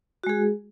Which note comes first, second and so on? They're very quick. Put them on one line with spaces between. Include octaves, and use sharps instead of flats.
F#4 G#3 G#4